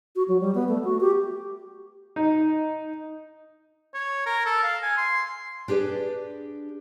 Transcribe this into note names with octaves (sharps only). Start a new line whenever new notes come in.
F#4
F#3
G3
B3
A3
F#4
G4
D#4
C#5
A#4
A4
F5
G#5
C6
D4 G4 G#4 B4 D5